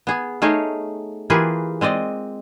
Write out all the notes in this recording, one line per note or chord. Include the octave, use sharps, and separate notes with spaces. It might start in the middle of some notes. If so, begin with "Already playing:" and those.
B3 G#4
A3 D#4 G#4 C#5 D#5 F5
E3 A#3 F4 G4 G#4 B4
G#3 C4 D5 D#5